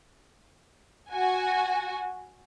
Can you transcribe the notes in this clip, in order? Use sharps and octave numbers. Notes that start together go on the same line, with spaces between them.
F#4 G#5